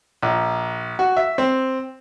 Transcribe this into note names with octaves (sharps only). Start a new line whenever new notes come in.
A#1
F#4
E5
C4